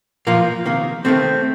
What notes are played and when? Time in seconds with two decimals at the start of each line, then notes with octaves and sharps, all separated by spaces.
0.27 A#2 F3 A#3
0.66 C3 D#3 A#3
1.05 C3 D#3 A3 C4